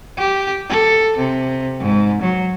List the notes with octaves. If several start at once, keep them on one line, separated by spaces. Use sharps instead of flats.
G4
A4
C3
G#2
F#3